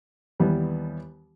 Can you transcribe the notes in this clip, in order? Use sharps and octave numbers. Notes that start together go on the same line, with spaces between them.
D#2 E3 G3 B3